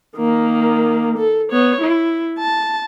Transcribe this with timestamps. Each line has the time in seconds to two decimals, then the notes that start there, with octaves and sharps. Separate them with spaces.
0.17 D#3 A#3
1.18 A4
1.52 B3 C#5
1.81 E4
2.39 A5